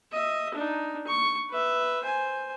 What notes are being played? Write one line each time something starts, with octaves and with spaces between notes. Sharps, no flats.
D#5 E5
D4 D#4
C#6
B4 E5
C5 G#5